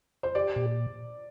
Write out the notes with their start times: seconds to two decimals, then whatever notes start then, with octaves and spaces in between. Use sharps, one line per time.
0.23 C5
0.35 G4 D5
0.56 A#2